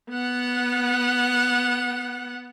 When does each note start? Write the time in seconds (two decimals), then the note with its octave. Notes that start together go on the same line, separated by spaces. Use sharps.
0.10 B3 F#5